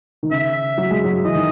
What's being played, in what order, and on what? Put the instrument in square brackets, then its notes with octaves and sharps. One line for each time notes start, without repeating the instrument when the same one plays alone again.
[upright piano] D#3
[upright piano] C#3 [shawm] E5
[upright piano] F#3
G#3
F#3
[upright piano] E3 [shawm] D#5
[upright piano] D#3